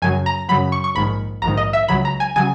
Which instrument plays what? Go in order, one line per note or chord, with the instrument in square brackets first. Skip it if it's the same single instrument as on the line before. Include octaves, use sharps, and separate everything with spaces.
[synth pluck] F#2 C#3 F#3 G#5
A#5
F#2 C#3 F#3 B5
C#6
C#6
A#1 G#2 D#3 B5
A#1 G#2 D#3 A#5
D#5
E5
C#2 C#3 F#3 B5
A#5
G#5
C#3 F#3 G#5